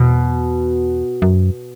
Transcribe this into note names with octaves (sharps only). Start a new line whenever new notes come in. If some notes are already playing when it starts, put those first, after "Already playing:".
Already playing: E2 B2
F#2